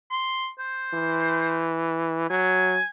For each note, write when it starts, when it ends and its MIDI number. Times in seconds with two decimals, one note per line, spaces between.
0.11 0.47 84
0.59 1.70 72
0.94 2.30 52
2.30 2.78 54
2.30 2.89 80